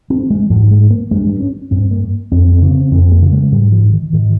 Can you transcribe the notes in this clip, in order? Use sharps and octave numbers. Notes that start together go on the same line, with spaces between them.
C4
G#3
G#2 F3
G#3
A#3
G2 G#3
C#4
G2 C4
A#3
F2 C4
C4
C#3
C4
F2 C4
A#3
C#3
G#3
G#2 G3
F3
D#3
G#2 D#3